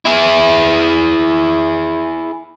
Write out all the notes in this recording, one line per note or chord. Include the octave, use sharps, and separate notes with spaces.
E4 G#4